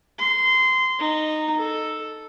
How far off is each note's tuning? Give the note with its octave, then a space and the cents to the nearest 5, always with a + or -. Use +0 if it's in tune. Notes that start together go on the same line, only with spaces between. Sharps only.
C6 -20
D#4 -15
A4 +0